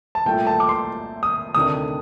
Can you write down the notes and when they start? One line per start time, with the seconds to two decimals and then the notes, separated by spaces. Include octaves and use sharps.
0.15 A5
0.26 C2 A#2 A3 G5
0.47 A5
0.60 D6
0.69 C6
1.23 D#6
1.55 D2 C3 D#3 A3 D4 D#6